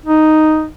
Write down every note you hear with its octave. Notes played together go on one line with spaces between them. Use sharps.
D#4